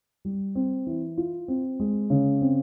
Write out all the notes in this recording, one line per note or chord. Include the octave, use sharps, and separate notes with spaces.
G3
C4
E3
F4
C4
G#3
C#3
C4